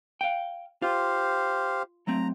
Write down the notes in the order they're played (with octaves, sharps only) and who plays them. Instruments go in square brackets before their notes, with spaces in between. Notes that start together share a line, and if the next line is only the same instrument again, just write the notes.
[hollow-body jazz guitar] F5 G5
[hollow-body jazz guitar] F4 [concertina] G4 C5 F5
[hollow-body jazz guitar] F#3 A3 C4 [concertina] A#5